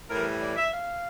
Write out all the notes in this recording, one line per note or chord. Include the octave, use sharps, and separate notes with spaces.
A2 E3 G3 A#4
D5
E5
F5